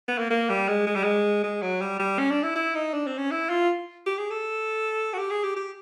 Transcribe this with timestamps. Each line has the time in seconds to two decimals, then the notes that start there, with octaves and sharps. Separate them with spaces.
0.08 B3
0.18 A#3
0.30 A#3
0.49 G3
0.69 G#3
0.87 G#3
0.96 G3
1.04 G#3
1.44 G#3
1.62 F#3
1.81 G3
1.99 G3
2.19 C#4
2.31 D4
2.44 E4
2.55 E4
2.75 D#4
2.93 D4
3.06 C4
3.18 C#4
3.31 E4
3.49 F4
4.06 G4
4.18 G#4
4.31 A4
5.14 F#4
5.19 G4
5.31 G#4
5.44 G4
5.56 G4